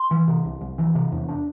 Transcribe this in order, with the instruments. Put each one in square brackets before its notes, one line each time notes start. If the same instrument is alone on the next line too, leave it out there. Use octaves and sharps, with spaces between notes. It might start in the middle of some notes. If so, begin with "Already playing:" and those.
Already playing: [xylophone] C6
[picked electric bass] E3
C3
C2
C2
E3
C3
E2
D4